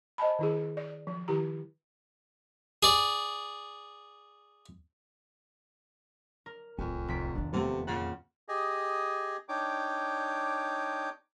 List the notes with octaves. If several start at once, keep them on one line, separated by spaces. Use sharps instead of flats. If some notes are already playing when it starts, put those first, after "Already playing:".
C5 D#5 G#5 A5 B5
D#3 E4 G#4
D5
F3
D#3 E4 G4 A#5
G#4 D5
A#4
D1 C2 F2 G#5
F1 B6 D7
E2 D#3 D4
C3 A3 B3 A4
F2 A#2 C#3 F4 F#5
G4 G#4 D#5
D4 D#4 C#5 G5 D6